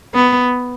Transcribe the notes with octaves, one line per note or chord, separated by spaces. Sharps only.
B3